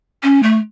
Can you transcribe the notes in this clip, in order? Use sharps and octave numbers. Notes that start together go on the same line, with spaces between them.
C#4
A3